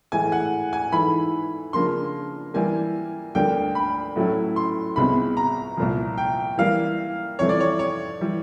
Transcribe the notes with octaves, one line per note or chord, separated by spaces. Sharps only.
A2 E3 G#3 G#5
F#5
G#5
G#2 E3 A3 B5
C#3 F3 A#3 D4 C6
E3 G3 A#3 G#5
D2 D3 G3 A#3 G5
B5
A2 F#3 A3 C#4 E4
C6
C2 B2 G#3 C4 B5
A#5
C2 A#2 F3
G5
E3 G3 A#3 F5
F2 C3 E3 G3 C4 C#5
D5
C#5
C#5
E3 G3